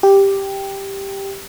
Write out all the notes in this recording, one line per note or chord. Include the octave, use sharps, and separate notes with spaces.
G4